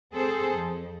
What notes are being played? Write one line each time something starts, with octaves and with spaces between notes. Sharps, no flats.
C4 G#4 A4 C5
F2